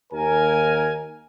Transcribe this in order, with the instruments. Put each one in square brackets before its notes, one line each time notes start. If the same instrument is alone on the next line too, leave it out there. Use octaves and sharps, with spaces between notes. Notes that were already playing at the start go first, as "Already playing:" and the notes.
[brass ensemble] D#2 A#4 G#5